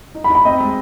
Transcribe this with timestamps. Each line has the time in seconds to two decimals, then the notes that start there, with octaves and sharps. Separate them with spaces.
0.15 D#4
0.24 B5
0.30 D#4
0.35 B5
0.45 C4 D#5
0.60 G#3